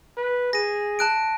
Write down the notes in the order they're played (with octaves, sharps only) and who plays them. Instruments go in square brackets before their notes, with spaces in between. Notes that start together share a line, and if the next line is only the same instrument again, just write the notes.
[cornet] B4
[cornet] G#4 [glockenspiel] A#6 D#7
[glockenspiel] A5 F#6 D7